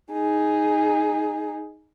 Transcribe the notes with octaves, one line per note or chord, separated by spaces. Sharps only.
D#4 G#4